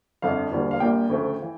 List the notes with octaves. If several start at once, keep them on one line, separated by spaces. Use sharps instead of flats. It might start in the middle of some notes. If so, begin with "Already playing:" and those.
G1 F2 D3 F5
E1 D2 D3 G3 A#3
F5
A#1 A#2 G3 A#3 G5
D2 C#3 F3 A3
E3